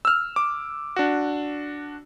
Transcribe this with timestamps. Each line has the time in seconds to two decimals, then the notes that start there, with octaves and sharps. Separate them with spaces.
0.05 E6 F6
0.36 D6
0.96 D4 F#4